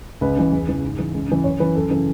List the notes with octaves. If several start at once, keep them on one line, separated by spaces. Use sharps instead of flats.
C#2 B4
C#3 E3
E2
C#3 E3
G#2
E3
C#2
C#3 E3
F#2 C#5
E3 B4
F#2 A4
C#3 E3